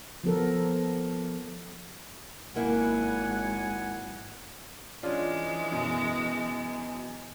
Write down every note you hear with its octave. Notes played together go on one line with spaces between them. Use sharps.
F3 B3 A4 A#4
G#1 F#3 A#3 E4 F#5 G#5
E3 G#3 C#4 D4 F4
F#2 B2